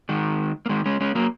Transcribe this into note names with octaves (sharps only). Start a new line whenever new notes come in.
D#3 G#3
A#3
D#3 G#3
G#3 C#4
G#3 C#4
F#3 A#3